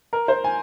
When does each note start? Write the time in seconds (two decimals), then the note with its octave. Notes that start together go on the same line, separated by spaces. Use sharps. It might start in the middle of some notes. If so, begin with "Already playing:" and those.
0.13 A#4
0.28 C5
0.44 G#5